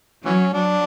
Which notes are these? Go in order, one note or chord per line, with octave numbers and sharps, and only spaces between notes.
E3 F#3 C#4
F#3 D4